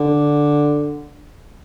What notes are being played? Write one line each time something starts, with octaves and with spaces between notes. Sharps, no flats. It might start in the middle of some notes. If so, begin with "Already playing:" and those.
Already playing: D3